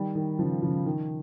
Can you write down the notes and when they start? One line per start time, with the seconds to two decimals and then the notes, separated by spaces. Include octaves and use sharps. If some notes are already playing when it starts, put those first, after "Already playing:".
Already playing: D#3 G3
0.15 D#3
0.39 C#3 F3
0.62 C#3 F3
0.85 D#3